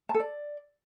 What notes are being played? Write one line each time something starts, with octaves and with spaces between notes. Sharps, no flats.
A5
A4
D5